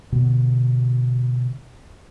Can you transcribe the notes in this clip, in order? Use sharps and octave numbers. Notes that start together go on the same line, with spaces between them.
B2 D3 B3